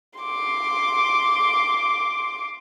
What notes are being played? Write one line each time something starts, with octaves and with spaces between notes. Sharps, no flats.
C6 D6